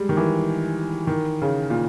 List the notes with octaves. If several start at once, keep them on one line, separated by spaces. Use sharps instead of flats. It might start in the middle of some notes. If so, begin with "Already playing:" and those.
Already playing: G3 G#3
D#3
E3
D#3
C#3
A#2